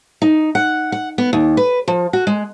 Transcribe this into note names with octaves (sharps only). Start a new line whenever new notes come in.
D#4
F#5
F#5
B3
D#2
B4
F3
F#4
G#3